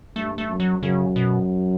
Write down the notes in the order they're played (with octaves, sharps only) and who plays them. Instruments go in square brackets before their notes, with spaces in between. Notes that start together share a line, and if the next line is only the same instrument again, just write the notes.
[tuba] G2 [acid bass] A3
[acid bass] A3
[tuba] F#2
[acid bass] F#3
[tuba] F#2 [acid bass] C#3
[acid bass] B2